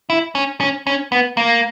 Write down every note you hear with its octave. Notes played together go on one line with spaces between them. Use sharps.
E4
C#4
C#4
C#4
B3
A#3